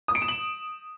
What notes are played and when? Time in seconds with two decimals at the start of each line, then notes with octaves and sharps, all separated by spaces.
0.08 D#6
0.15 D7
0.22 E7
0.28 F#7